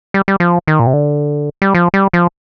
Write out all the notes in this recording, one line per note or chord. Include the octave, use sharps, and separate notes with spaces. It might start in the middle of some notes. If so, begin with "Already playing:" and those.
G3
G3
F3
D#3
A#2
C3
D3
G3
F3
G3
F3